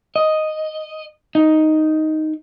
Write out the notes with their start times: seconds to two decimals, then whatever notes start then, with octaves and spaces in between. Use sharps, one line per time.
0.16 D#5
1.35 D#4